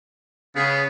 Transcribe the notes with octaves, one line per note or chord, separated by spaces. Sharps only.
C#3 B3 G#4